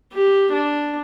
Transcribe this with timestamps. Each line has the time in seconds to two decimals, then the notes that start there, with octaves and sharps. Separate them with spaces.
0.13 G4
0.52 D4